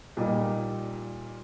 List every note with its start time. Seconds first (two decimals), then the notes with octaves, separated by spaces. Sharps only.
0.17 A#2 G3 A#3 D#4